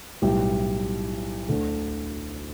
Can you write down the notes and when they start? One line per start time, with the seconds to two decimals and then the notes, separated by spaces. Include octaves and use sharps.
0.22 B1 A2 G3 E4 G4
1.48 D2 D3 A3